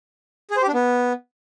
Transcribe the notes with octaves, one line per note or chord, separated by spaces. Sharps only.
G#4
C5
G4
D4
B3